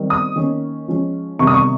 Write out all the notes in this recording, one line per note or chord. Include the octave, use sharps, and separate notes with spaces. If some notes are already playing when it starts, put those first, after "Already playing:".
Already playing: D#3 G3 C4
D#6
D#3 A#3 C#4
F3 G#3 C#4
C3 D#3 G3 C#6
D#6
C#6